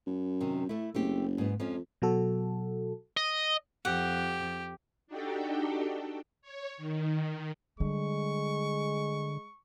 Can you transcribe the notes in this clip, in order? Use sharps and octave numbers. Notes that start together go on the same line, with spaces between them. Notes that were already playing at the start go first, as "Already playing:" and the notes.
F#2
C3 D#3
A2 A3 E4
F#1 A3 C4 G4
G#2 B3
F2 F3 G#3 C#4
B2 F#3 F#4 A4
D#5
F2 G4 F#5
D4 D#4 F#4 G4 A4 G5
C#5
D#3
D3 G3 G#3 C#6